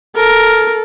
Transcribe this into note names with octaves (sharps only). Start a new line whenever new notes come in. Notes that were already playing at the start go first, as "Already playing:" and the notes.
A4 A#4